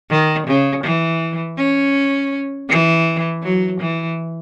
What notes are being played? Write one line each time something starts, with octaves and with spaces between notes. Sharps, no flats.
D#3
C#3
E3
C#4
E3
F#3
E3